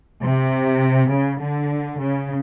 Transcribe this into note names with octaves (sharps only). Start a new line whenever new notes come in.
C3
C#3
D3
C#3